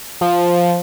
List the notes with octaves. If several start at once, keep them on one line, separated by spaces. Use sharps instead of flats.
F3